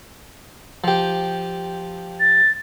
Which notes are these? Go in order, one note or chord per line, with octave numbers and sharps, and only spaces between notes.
F3 G4
A6